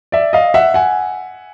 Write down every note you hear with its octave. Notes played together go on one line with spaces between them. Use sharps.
D5 E5
D#5 F5
E5 F#5
F#5 G#5